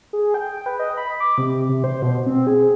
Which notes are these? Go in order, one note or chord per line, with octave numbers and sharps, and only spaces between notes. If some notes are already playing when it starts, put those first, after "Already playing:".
G#4
G5
B4
D#5
B5
D6
C3
C3
C5
B2
C4
G#4